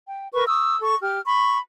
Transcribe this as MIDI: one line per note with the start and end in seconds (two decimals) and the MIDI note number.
0.04 0.27 79
0.33 0.44 70
0.33 0.44 71
0.33 0.44 85
0.47 0.76 85
0.47 0.76 87
0.47 0.76 88
0.81 0.95 69
0.81 0.95 85
1.01 1.19 67
1.01 1.19 89
1.25 1.58 83
1.25 1.58 85